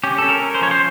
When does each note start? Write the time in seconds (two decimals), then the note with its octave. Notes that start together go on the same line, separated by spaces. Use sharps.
0.03 C#4 G4
0.18 C#4 A4
0.29 A#4
0.42 C#4
0.55 C5
0.61 F3 C#5
0.71 C5